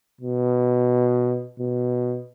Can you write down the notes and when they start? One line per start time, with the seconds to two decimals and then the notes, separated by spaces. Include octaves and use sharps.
0.21 B2
1.59 B2